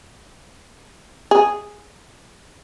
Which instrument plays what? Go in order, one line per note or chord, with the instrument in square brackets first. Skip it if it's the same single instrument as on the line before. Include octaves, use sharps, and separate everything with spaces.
[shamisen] G#4